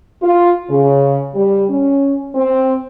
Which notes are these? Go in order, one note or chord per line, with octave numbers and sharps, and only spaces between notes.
F4
C#3
G3
C#4
C4